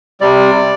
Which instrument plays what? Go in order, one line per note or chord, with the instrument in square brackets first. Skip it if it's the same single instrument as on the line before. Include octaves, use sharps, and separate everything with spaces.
[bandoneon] C3 G3 D5